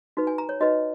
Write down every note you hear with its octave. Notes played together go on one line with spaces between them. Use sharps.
D#4 F#4 B4
G#5
A#5
C#5
D#4 F#4 B4 D#5